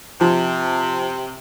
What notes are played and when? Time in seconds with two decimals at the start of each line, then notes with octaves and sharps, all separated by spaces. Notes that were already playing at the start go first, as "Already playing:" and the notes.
0.21 C3 F3